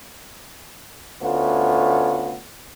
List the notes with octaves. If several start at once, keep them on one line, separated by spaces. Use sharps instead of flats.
D2 A3 B3 C#4 F4